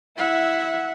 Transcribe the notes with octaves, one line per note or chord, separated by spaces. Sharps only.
E4 E5 F#5